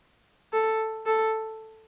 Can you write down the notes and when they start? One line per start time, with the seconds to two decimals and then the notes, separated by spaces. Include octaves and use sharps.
0.53 A4
1.06 A4